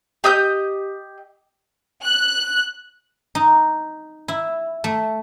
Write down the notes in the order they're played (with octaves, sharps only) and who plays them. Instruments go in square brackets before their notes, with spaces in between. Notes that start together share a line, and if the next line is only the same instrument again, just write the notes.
[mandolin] G4 D#5 D#6 G6
[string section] F#6
[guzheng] D#4
E4
A3